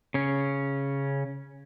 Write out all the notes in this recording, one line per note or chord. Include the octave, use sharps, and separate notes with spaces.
C#3 C#4